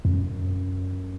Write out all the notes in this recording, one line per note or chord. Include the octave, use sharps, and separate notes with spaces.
F2
F#2